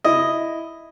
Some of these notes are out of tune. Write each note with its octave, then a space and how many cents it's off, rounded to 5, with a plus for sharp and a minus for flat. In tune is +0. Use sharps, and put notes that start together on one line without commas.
E4 +0 D#5 +0